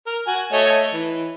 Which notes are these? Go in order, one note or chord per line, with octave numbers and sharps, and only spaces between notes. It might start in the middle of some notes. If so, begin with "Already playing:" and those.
A#4
F#4 G#5
A3 C#5 D#5
E3